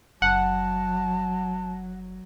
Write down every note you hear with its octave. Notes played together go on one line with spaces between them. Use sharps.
F#1 F#3 F#5 A5